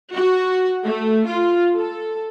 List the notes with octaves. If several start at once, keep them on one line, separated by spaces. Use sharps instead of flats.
F#4
A3
F4
A4